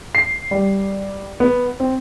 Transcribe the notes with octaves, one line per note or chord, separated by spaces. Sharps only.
C7
G3
B3
C4